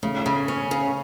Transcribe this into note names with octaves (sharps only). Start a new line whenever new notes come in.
C#3 A3
C#3
C#4
C#3